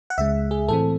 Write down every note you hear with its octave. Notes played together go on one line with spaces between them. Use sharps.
F#5
C#2 C#3 G#3 E5
G#4
A2 E3 C4 A4